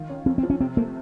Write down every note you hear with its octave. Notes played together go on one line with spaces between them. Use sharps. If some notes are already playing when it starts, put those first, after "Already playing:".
Already playing: D#3 F4
C#4
F2 C4
C4
F3
C#4
C3 C4
A3 A#3